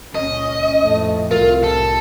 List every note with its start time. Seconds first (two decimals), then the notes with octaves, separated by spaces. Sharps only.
0.15 C#2 A#2 C#4 D#5
0.78 F2 A2 A3
1.31 C2 A2 F4 A#4
1.64 A4